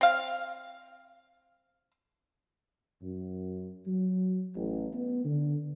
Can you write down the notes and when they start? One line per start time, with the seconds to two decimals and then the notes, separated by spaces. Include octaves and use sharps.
0.01 C4 F5
3.02 F#2
3.87 F#3
4.55 A1
4.94 B3
5.25 D3